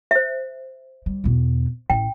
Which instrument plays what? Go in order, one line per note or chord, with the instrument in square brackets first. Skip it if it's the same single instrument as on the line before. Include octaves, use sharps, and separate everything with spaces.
[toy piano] C5 E5
[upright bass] G3
E2 B2
[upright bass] A1 [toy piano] G5